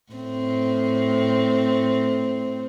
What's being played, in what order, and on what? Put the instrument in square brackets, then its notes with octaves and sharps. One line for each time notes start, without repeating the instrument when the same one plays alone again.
[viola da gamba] A2 C4